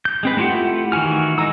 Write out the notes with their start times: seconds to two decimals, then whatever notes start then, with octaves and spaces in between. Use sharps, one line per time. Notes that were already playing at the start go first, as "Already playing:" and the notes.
0.05 G6
0.23 G#3 C4 B4
0.37 A3 E4 F4 G4 F#5
0.92 D#3 E3 F#4 G#5 F6
1.38 G#3 D#4 A#5 E6